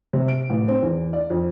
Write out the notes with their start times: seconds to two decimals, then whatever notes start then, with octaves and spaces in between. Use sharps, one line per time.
0.13 C3
0.28 D7
0.50 A1
0.68 C4
0.82 E2
1.13 D5
1.30 F2